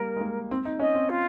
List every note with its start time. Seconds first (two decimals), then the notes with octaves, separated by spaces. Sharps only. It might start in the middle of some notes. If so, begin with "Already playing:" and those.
Already playing: G3 A#3 A#4
0.16 G#3
0.21 A#3
0.51 C4
0.65 D#4
0.79 C#4 D#5
0.95 C4
1.09 F4